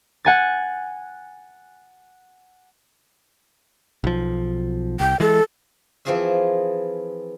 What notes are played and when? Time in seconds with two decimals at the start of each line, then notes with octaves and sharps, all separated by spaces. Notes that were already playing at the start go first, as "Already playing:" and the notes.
0.25 F#5 G#5 A6
4.04 B1 F3
5.00 C2 G5
5.20 E3 G#3 A4
6.05 E3 F3 C4 F4 G#4 E5